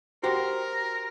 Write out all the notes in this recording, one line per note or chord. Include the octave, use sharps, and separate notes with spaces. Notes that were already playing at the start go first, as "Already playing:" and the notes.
F#4 G4 A#4 C5